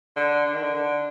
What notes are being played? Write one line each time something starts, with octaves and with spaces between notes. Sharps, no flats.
D3
D3
D#3
D3
D3